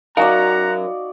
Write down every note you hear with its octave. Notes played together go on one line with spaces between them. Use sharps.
F#3 D#4 F#4 A#4 D5 F5 F#5 A#5